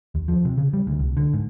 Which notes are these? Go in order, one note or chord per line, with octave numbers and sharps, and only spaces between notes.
D#2
F3
C3
C#3
G3
D2
C2
D3
G#2